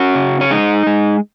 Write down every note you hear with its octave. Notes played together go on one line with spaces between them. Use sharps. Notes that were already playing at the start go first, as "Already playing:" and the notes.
Already playing: C#4 F#4
C#3
C#4
G#3 D#4
G#3